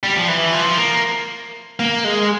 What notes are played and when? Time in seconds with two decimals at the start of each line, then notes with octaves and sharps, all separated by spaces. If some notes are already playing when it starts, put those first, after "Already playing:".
0.04 G3
0.15 F3
0.28 E3
0.53 F3
0.78 A#3
1.80 A#3
2.04 G#3